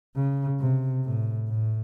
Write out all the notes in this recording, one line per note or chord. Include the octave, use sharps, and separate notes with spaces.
C#3
C3
A2
A2